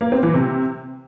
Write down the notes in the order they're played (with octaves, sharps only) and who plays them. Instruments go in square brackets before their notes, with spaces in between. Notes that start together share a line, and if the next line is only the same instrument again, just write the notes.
[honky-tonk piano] A#3
C4
E3
C3